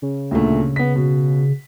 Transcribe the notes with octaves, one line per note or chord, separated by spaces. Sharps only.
C#3
D2 A#2 A3
B3 B6
B2